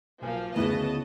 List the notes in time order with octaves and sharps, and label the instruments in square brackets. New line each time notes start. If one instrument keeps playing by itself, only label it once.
[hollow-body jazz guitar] B1 G#5 [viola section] F3 A#3 F5
[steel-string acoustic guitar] D2 C#3 [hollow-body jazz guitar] A3 E4 B4 [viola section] B3 D#5 A5